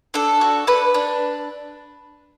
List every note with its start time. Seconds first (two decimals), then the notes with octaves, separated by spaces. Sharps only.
0.14 D4 A4
0.41 F#4
0.67 D4 B4
0.94 D4